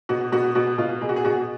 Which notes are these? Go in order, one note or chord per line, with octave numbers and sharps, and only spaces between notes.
B2 F#4
B2 F#4
B2 F#4
B2 F4
B2 G#4
F#4
G#4
B2 F#4